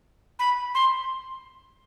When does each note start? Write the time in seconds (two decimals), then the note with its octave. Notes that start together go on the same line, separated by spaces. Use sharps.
0.39 B5
0.75 C6